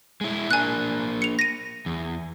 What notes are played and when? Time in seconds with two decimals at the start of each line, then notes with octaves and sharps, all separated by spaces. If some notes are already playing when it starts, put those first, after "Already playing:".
0.21 G#3 E4
0.51 A#3 D4 A#4 G#5 F#6
1.22 C#7 F7
1.39 A#6 D#7
1.86 E2